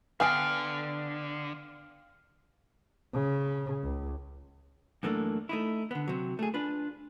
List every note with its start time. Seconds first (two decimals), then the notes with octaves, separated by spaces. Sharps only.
0.20 D3 B3 F5 G5 G#5 D#6 F6 D7
3.13 C#3
3.84 C#2
5.03 F#2 E3 A3 A#3 D4
5.49 A3 D#4 E4
5.91 D3 B3
6.08 C3 F#3
6.39 A3 G#4
6.54 D4 F4 B4